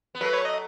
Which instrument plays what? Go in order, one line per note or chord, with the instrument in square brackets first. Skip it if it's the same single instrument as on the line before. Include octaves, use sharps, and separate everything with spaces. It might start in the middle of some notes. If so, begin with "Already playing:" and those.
[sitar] B3
[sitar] F#3 A3 [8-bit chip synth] B4
[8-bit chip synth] C#5
D#5